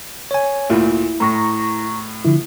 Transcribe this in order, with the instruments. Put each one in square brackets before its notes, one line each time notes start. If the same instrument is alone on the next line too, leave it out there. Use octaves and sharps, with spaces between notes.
[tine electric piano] C#5 G#5
[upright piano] D2 A#2 [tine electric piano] E4
[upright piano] A2 [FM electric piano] A#5 C#6 A#6
[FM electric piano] D3 F3 E4